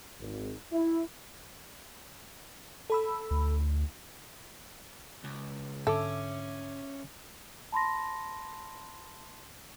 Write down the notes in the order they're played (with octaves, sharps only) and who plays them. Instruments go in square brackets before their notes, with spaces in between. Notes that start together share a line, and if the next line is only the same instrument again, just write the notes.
[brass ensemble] G#1
E4
[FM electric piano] A4 B5 E6
[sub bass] D2
[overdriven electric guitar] C#2
[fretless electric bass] G#2 D3 D4 [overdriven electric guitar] C#4 [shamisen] A4 [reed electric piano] E5 D6
[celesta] A5 B5 C6 A#6